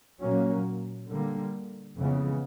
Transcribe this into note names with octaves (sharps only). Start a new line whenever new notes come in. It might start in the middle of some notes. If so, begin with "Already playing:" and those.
A#2 F#3 A#3 C#4
D3 G3 A#3
F2 C#3 E3 G#3 B3